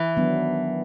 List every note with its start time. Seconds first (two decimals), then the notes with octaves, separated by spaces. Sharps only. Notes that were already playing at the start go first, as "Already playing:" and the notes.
Already playing: E3
0.16 D#3 F#3 B3 D4